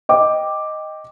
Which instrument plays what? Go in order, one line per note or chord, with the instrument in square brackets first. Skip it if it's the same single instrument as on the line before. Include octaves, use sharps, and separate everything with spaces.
[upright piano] D#5 G5 D6